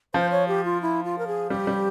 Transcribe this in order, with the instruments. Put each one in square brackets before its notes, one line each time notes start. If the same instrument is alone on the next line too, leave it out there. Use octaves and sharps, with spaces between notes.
[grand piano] F3 [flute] C5
[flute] C#5
G4
F4
E4
F4
A#4
G#4
[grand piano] G3 [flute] G4
[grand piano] G3